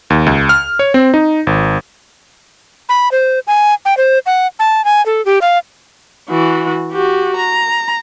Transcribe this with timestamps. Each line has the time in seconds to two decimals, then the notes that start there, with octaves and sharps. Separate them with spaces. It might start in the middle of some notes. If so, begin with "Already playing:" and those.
0.10 D#2
0.26 C#2
0.49 F6
0.79 C#5
0.94 C4
1.14 D#4
1.47 G#1
2.89 B5
3.12 C5
3.47 G#5
3.85 G5
3.97 C5
4.26 F#5
4.59 A5
4.85 G#5
5.06 A4
5.26 G4
5.42 F5
6.30 E3 F#4
6.92 F#4 G4
7.37 A#5